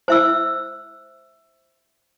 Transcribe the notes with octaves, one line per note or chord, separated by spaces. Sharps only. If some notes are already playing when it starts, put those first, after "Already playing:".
C5 E5 E6